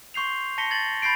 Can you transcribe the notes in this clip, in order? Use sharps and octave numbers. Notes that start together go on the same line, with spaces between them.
C6 C#6 G6 C7 F7
A5 A#6 B6 C#7 G7
G#6 A6 F#7
B5 G6 A6 C7 D7